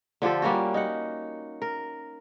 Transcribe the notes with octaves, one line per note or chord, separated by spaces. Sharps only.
D3 F3 G4 A4
G3 A#3 C#4 F#4
D#4 F#5
A#4